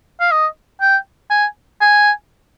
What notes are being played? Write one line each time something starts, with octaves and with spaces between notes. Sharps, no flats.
F5
D#5
G5
G#5
G#5